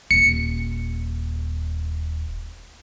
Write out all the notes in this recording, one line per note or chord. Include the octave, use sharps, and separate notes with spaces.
D#1 C#7